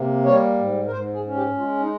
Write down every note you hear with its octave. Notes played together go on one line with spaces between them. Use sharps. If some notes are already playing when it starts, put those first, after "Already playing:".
Already playing: C3 A#3
G3 C#5
G#2
A#4
G#2 C5
G#4
C#4
G4
G#3 F4
D#4